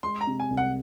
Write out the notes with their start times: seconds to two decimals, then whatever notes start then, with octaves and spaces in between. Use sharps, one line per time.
0.03 G#3 C6
0.21 A#5
0.27 C3
0.40 G#5
0.50 C2
0.57 F#5